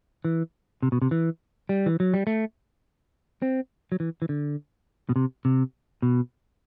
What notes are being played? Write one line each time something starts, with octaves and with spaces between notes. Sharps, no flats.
E3
C3
B2
C3
E3
G3
E3
F#3
G3
A3
C4
F#3
E3
E3
D3
B2
C3
C3
B2